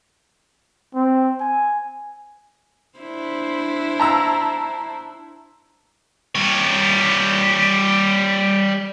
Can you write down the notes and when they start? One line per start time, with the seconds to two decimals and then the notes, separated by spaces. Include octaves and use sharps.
0.95 C4
1.40 G#5
2.99 D4 E4 C5
4.00 A5 A#5 E6
6.35 G3 C#5